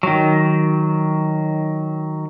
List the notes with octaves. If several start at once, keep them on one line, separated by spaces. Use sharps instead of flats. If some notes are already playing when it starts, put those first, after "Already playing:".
D#3 F#3